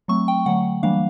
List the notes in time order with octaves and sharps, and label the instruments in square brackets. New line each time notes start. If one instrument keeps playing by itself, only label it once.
[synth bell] F#3 A3 C4 C#6
G5
D3 F#3 A3 F#5
E3 G3 A#3 D4 F5